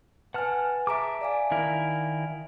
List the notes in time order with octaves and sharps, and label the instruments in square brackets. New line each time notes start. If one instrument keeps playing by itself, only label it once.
[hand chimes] B4 G#5 [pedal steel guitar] F#5 A5 F6
[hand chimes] G#4 A#5 D7 [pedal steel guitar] E5 A5 D6
[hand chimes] D5 F5 G#5
[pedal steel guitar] D#3 E4 A#4